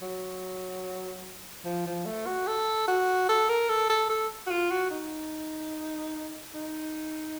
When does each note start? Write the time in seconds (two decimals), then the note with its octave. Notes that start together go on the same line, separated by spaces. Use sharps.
0.02 F#3
1.65 F3
1.86 F3
2.06 A3
2.26 F#4
2.47 A4
2.88 F#4
3.29 A4
3.49 A#4
3.69 A4
3.89 A4
4.09 A4
4.47 F#4
4.50 F4
4.71 F#4
4.91 D#4
6.54 D#4